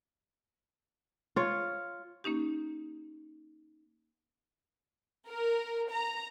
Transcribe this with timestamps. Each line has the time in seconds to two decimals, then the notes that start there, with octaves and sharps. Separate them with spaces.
1.36 F4 C#5
2.24 A#3 C#4 D#4 G4
5.29 A#4
5.90 A#5